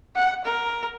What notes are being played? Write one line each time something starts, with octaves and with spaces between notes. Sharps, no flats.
F#5
A#4